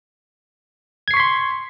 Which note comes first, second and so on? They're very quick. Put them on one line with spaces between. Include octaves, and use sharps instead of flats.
G#6 C7 C#6 B6 C6